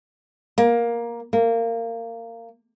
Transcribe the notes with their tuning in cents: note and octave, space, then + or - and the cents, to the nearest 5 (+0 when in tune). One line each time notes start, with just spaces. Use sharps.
A#3 +10
A#3 -20